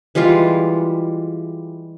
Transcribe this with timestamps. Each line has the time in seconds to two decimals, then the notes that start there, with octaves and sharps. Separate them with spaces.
0.15 E3 G3 G#3 F4